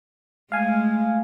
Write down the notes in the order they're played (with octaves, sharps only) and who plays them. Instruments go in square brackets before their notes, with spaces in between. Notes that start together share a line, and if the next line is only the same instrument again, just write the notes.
[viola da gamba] G#3 A3 [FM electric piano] F5 G#5